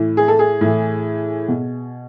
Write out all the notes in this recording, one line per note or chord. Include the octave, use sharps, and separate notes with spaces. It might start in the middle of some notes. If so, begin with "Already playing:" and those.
Already playing: A2 E3
G#4
A4
G#4
A2 E3
B2